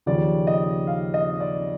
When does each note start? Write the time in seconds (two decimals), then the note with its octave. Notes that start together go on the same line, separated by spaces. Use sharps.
0.06 D#2 C#3 F3 D5
0.47 D#5
0.87 F5
1.14 D#5
1.40 D5